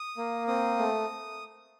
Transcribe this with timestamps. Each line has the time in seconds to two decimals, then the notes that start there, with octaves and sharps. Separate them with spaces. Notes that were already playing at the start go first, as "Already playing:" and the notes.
Already playing: D#6
0.17 A#3
0.47 C4 D#6
0.78 A3